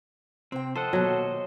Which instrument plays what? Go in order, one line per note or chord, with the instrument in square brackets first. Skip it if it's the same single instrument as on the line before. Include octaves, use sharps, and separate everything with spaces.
[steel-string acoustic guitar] C3 G5 [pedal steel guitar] C4
[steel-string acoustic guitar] F3 [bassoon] A4 [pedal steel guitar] C5 D#5 F#5
[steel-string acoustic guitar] D#2 B2 [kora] F#3